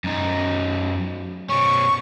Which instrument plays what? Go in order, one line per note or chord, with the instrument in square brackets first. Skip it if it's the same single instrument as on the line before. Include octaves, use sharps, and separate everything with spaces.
[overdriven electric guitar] F#2 D#4
[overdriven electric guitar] B2 C#4 [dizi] C#6